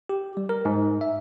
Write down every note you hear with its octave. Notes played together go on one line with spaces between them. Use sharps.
G4
G3
A#4
G#2
E5